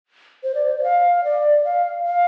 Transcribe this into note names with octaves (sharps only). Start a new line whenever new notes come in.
C5
D5
C5
D5
F5
D5
F5
F5